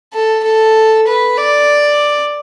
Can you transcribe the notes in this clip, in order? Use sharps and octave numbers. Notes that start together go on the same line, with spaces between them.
A4
A4
B4
D5